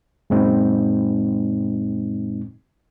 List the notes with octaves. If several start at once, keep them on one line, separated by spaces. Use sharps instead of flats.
F#2 A#2 G#3 C4 D#4